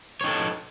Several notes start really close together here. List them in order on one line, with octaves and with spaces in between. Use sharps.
C#5 D#4 A4